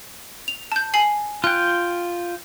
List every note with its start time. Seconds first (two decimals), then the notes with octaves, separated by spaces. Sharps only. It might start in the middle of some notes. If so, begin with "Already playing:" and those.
0.48 F7
0.72 A5 G6
0.94 G#5 C7 F#7
1.44 F4 G5 F#6